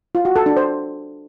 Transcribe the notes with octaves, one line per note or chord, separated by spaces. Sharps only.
F4
F#4
A4
D4
C5